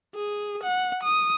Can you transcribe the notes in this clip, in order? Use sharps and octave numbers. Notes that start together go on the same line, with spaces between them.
G#4
F#5
D#6